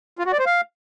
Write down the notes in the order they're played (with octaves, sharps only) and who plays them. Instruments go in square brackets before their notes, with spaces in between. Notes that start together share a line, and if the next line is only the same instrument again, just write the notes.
[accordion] F4
F#4
D5
C5
F5